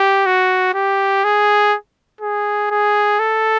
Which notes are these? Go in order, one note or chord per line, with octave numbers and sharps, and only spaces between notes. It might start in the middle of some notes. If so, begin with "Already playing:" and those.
Already playing: G4
F#4
G4
G#4
G#4
G#4
A4